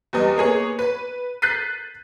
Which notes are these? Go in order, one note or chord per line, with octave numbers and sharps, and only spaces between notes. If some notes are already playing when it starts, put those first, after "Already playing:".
E2 G3 B3 D#5
A#3 B3 G#4 C#5
B4
F#6 G6 A6 B6 C7 D#7